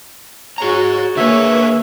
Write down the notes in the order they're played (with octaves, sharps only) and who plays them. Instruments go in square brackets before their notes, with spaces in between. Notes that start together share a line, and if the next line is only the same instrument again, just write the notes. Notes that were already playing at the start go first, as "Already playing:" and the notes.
[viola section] F#4 C#5 [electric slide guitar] G#4 A#5
[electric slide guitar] D3 B4 [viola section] A#3 G#4 C#5 [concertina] E5